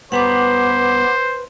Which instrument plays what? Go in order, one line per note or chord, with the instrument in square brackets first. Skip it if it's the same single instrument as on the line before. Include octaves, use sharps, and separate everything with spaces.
[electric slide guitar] G2 B3 [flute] B4 [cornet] C5 [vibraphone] F#5 D6